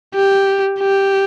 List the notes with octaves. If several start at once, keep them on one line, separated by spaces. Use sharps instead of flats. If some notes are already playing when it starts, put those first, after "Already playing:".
G4
G4